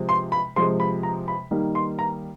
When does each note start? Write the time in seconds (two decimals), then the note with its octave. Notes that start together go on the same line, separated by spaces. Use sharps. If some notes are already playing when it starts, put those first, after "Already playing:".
Already playing: C3 F3 G#3
0.09 C6
0.32 B5
0.56 C3 F3 G#3 C6
0.80 B5
1.03 A#5
1.28 B5
1.51 D#3 G3 A#3 D#4
1.75 C6
1.99 A#5